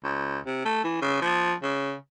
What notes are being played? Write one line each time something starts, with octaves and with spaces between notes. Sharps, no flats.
C#2
C3
A3
E3
C#3
F3
C#3